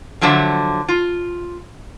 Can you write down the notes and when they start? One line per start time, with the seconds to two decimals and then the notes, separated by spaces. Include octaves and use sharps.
0.21 D3 F3 F#3 D4 E5
0.88 F4